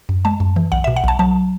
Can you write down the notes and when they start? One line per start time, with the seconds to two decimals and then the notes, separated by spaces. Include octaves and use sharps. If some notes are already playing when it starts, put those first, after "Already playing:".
0.09 F#2
0.25 G#3 A5
0.40 F#2
0.56 E3
0.72 B1 F#5
0.84 B2 E5
0.96 F#5
1.04 B1 A5
1.19 F#3 A5